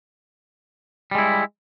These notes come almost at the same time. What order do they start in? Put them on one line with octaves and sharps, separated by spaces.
G3 G#3 E4